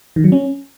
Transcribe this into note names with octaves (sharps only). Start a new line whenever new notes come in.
D#3
F#3
C#4